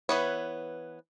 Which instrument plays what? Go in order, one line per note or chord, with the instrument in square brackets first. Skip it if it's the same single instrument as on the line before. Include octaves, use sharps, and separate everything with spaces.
[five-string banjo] E3 B3 C#5